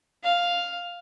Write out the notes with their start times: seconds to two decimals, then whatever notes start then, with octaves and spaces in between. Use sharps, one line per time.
0.24 F5